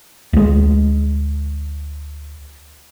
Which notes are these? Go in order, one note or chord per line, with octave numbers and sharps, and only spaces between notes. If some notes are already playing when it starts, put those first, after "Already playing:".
D2 G#3